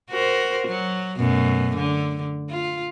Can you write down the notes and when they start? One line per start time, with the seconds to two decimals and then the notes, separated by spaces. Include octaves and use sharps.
0.10 F#4 A#4 C5
0.67 F#3
1.18 F#2 B2 A3
1.75 D3
2.50 F4